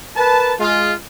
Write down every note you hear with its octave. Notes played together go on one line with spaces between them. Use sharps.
A#4 B4 A5
G#3 F4